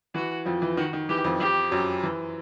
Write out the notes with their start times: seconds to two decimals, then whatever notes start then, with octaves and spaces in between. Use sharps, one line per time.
0.14 E3 F#4
0.45 F2 F3
0.62 E3
0.77 D#3 F#4
0.93 D#3
1.09 E3 G4
1.24 F2 F3
1.40 F2 F3 G4
1.71 F#2 F#3
2.03 E3